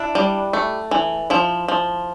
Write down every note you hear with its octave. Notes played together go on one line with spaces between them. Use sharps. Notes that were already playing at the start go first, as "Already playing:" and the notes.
Already playing: D4 E4
G3
A3
E3
F3 E4
F3